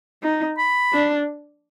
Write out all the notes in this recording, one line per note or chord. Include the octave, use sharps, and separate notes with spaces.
D#4
B5
D4